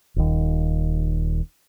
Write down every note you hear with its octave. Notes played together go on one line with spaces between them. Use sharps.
D#1 D#2